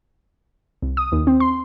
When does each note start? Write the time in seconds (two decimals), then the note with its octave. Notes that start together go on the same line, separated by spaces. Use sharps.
0.82 C2
0.97 D#6
1.12 D#2
1.27 C4
1.40 C6